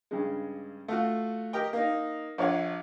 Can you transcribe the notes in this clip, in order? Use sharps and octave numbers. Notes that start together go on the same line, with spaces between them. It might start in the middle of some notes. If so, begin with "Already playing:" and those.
G2 C#3 G#3
A3 F4 F#4
G4 A#4 D#5 G5
A#3 D#4
A#1 F4 C#5 F5 F#5